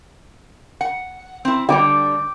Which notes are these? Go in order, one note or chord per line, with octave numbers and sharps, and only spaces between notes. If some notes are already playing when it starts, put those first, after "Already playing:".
F#5
C4 E4
D3 G3 G5 D6